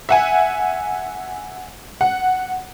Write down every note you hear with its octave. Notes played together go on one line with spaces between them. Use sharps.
E5 F#5 G#5
F#5